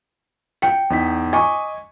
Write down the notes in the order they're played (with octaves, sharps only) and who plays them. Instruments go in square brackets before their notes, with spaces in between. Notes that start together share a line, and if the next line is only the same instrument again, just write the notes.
[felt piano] G5 C#7
[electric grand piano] E2 D#4 B6
[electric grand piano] D#5 D6 [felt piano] G#5 C#6